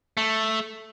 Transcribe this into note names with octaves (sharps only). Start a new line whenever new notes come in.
A3